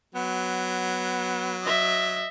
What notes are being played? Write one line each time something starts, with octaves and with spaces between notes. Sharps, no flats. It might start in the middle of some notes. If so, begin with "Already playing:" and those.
F#3 B3
D#5 E5